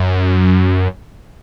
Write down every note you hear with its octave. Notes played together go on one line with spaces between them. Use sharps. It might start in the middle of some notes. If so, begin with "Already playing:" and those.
Already playing: F#2